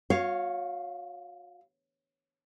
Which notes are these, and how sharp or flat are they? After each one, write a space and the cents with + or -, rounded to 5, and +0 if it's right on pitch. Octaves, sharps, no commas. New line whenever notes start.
F#4 -35 C#5 +0 F5 +0